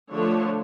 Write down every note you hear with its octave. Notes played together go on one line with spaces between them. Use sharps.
D3 F3 A3 D4 C#5